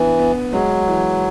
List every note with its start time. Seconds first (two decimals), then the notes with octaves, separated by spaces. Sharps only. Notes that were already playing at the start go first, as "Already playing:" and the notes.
Already playing: E3 B3 D4
0.19 B3
0.53 F#3 G#3
0.87 E3